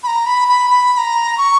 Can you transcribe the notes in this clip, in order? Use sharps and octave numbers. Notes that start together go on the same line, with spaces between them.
B5
A#5
B5
B5
B5
B5
A#5
C#6